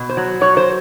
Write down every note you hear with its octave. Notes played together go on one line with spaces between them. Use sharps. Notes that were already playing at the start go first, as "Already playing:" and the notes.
Already playing: B2
C5
F#3
F#3 C#5
C5